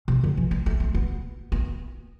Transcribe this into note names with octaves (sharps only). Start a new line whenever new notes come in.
C3
D3
E3
G#3
A3
C4
B3
B3